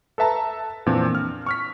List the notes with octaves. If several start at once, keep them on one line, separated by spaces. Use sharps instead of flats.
A4 B4 E5 A5 A#5
F2 A#2 E3 C4 D4
F6
C#6 F6 B6